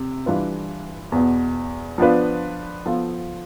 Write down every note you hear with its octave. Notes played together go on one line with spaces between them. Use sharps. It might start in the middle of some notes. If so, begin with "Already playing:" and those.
Already playing: C3
E3 G3 D4 F4 B4
E2 B2 B3
F3 B3 D4 F4 B4
F3 B3 F4 A4